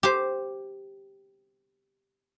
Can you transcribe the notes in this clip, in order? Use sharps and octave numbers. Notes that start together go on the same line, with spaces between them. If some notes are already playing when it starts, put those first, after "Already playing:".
G4 C5